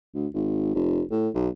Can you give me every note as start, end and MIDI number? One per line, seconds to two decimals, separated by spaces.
0.15 0.27 38
0.34 0.75 32
0.75 1.02 29
1.11 1.29 45
1.35 1.49 35